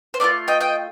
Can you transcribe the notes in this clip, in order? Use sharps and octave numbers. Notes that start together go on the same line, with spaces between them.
C5
A3 D4 F4 A#4 D5
D#5 G5
D#5 G5